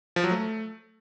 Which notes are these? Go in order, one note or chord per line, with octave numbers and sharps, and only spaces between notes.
F3
F#3
A3